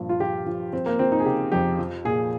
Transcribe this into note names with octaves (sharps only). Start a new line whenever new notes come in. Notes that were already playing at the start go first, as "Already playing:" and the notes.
Already playing: G2 A#2 F3
F4
F3 G4
F3
F3 C4
A#3
F3 C4
D#4
G#4
C#3 G4
F2 G4
F3
A#2 G#4